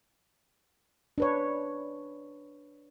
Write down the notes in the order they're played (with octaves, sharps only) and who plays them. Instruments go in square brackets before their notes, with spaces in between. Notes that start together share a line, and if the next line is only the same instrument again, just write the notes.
[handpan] D4 B4 C#5